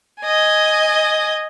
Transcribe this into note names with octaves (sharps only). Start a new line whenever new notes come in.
D#5 G#5